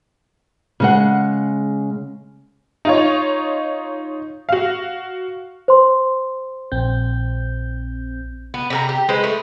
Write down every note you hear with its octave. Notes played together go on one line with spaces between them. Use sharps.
C#3 G#3 F#5
D#4 F4 C#5
F#4 F5
C5 C6
A#1 C4 G6
B3
C3 A4 A#5
G4
G#3 B4 C5
A3